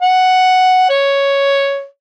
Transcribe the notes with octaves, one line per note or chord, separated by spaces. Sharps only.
F#5
C#5